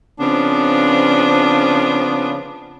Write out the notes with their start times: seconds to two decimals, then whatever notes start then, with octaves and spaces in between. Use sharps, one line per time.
0.20 C#3 F3 B3 C4 D4